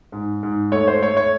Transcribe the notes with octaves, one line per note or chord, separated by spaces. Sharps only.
G#2
G#2
A3 C#5
C5
A3 C#5
C#5